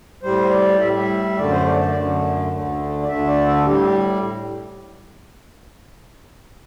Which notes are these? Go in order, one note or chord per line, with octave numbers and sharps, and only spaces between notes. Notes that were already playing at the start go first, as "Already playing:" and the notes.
A2 G3 C5
D5
A2 G3 E5
E5
F#2 D3 A3 D5
C5
D5
D5
F#2 D3 A3
D2 D3 A3
D5
D2 D3 A3 E5
D5
A4
A2 G3 G4